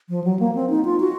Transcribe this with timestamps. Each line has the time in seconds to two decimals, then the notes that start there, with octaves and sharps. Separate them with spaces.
0.09 F3
0.24 F#3
0.39 A#3
0.55 C4
0.70 D#4
0.85 F4
1.00 F#4